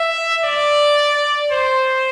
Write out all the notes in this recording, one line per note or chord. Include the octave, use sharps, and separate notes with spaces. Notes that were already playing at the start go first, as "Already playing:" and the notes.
Already playing: E5
D5
C5